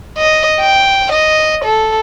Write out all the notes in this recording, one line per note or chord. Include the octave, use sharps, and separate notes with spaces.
D#5
G5
D#5
A4